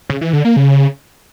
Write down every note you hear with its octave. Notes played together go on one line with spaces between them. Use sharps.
C#3
E3
D3
A#3
C#3